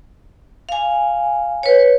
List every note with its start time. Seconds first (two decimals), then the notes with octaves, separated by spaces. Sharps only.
0.69 F5 G#5
1.63 B4 C#5